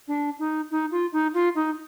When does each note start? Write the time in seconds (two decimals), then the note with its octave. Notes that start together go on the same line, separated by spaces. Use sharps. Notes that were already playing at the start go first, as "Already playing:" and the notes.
0.08 D4
0.39 D#4
0.71 D#4
0.92 F4
1.13 D#4
1.34 F4
1.55 D#4